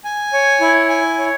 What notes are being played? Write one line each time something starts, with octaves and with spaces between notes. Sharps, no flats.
G#5
C#5
E4
G#5
C#5